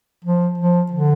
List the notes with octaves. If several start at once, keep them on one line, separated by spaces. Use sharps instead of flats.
F3
F3
D3